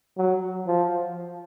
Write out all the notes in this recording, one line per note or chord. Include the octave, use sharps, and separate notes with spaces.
F#3
F3